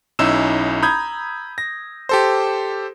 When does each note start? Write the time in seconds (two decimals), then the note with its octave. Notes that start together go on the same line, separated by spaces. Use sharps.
0.19 B1 C#4 D#4 E4 E6 E7
0.82 A#5 B5 D#6 G6 G#6
1.58 A#6
2.09 G4 A4 C5